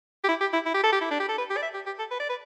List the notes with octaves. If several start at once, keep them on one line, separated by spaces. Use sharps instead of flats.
G4
E4
G4
E4
E4
G4
A4
G4
E4
D4
G4
A4
B4
G4
D5
E5
G4
G4
A4
B4
D5
B4